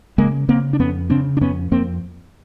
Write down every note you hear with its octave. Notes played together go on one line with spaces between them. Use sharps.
C#3 G#3 A#3
C#3 A#3 C4
D4
F2 B3 C#4
C#3 C4 D4
D4
F2 B3 C#4
F2 A#3 C4